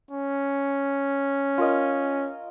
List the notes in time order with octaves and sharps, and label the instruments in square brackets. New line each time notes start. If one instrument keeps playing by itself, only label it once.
[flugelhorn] C#4
[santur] F4 A#4 D#5